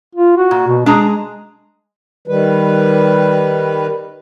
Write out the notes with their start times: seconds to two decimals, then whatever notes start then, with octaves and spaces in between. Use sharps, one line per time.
0.15 F4
0.37 F#4
0.51 A#2
0.68 B2
0.86 G#3 D4 G#4 A#5
2.28 D#3 G3 B4